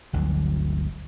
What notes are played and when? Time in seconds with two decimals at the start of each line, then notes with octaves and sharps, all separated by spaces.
0.13 G1 D2 D3 F#3